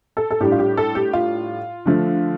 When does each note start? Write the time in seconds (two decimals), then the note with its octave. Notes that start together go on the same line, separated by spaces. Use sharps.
0.17 A4
0.31 A4
0.40 A2 G3 D4 G4
0.52 F4
0.59 G4
0.77 A4
0.95 G4
1.13 F4
1.86 D3 F3 A3